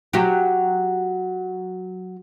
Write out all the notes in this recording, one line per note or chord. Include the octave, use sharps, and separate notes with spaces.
F#3 F#4 G4